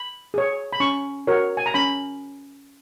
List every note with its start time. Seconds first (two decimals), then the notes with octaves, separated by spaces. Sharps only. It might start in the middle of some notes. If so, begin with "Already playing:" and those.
Already playing: B5
0.34 G#4 C#5
0.73 B5
0.80 C#4 C#6
1.27 F#4 A#4 C#5
1.57 G#5
1.66 A#5
1.74 C#4 B5